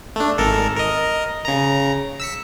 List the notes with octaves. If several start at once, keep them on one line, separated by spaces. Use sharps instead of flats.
A3 D4
G#1 A4 A#4
A#4 D#5
C#3 A#5
E6 B6 C#7